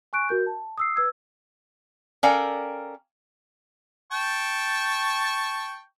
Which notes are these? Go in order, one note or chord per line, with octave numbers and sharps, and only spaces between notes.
G#5 C#6 F#6 D7
F#4 A#4 G6
A5
D#6 E6 C7
B4 E6 G#6
C#4 A4 A#4 D5 F5 G5
G5 A5 C#6